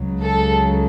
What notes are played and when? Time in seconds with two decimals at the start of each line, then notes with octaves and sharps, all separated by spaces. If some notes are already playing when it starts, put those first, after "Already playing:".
Already playing: C#2 C#3 F#3
0.25 A4